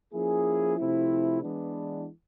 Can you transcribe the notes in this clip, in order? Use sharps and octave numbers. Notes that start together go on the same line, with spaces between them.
F3 A#3 C#4 E4 G#4
C3 F3 A3 C4 E4
E3 G#3 B3 D4